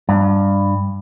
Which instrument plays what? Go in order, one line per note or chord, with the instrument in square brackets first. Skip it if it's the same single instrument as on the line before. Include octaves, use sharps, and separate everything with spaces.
[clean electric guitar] G2